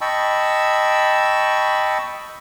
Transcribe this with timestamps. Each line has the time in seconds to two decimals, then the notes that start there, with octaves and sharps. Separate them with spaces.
0.01 D#5 G5 A5 B5 C#6 E6